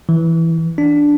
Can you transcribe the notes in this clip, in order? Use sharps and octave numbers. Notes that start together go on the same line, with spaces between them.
E3
D4